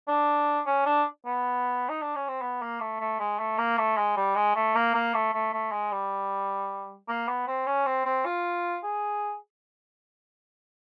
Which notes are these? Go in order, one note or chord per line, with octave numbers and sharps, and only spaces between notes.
D4
C#4
D4
B3
D#4
D4
C#4
C4
B3
A#3
A3
A3
G#3
A3
A#3
A3
G#3
G3
G#3
A3
A#3
A#3
A3
A3
A3
G#3
G3
A#3
B3
C4
C#4
C4
C4
F4
G#4